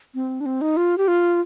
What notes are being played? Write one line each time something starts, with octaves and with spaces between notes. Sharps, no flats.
C4
D4
C4
D#4
F4
G4
F4